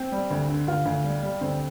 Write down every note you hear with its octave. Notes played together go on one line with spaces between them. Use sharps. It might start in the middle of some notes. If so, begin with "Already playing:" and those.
Already playing: C4
G3
D2
D3
D2 F4
D2
G3
G3
D2 C4